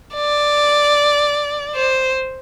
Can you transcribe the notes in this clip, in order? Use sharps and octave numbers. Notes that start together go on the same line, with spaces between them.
D5
C5